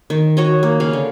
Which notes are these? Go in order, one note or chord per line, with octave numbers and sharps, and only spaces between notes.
D#3
F#4 C#5 D#5
A#3
C#3 F5
D3